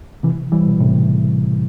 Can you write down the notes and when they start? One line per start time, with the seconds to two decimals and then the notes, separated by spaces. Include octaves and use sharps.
0.23 C3 E3
0.52 E3 G3
0.67 B2
0.80 A2 C3